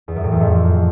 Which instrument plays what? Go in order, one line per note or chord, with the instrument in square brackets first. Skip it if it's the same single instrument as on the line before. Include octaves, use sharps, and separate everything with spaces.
[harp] E2
F#2
A2
E2
F2